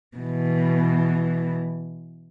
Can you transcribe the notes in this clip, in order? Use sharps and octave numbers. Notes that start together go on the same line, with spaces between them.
B2 E3